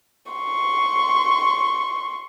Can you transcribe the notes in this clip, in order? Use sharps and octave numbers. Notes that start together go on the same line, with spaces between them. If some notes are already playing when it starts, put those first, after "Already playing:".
C6 C#6